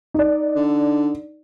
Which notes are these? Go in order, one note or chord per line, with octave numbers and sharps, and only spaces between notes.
D#4 D5
D3